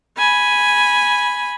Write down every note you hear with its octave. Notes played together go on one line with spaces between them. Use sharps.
G#5 B5